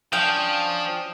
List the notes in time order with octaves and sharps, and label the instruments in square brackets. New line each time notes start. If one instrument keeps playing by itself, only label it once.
[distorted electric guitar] F3 [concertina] C#4 D4 [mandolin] F5 G5 [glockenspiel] D#6 D7 F7